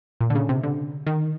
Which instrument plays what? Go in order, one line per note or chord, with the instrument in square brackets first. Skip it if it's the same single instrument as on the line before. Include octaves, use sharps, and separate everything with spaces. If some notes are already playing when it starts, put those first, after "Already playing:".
[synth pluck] A#2
D3
C#3
C3
D3
D#3